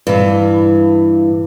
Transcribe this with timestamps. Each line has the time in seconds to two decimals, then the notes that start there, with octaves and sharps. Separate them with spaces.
0.07 G2 E3